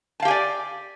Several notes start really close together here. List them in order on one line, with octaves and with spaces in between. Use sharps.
A5 F5 G4 G#5 D5